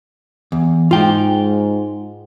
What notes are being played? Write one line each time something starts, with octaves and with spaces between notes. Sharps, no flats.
E2
G#2 F4 G5